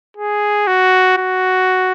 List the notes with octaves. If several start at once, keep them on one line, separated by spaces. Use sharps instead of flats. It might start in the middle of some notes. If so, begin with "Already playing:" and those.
G#4
F#4
F#4